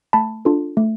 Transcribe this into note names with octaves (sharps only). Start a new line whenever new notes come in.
A3 A5 B5
D4 F4 A4
A3